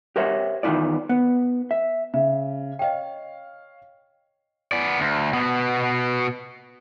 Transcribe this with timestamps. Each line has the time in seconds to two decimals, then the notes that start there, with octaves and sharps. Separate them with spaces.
0.16 G4 A#4 C5 C#5 E5
0.63 E2 D#3 E3 E4 F4 D5
1.09 B3
1.71 E5
2.14 C#3 E5
2.79 C#5 D#5 F5 G5
4.72 B3 D5
5.00 D2
5.33 B2 B3